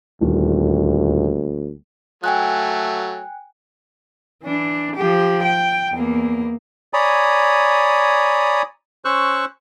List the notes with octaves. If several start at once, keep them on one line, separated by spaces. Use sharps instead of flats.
D#1 D2
F#3 A3 G5 G#5 F#6
E3 D4
F3 G4
G5
E2 A#3
C#5 D5 G#5 A#5 B5 D#6
C#4 C5 C#6 E6 F#6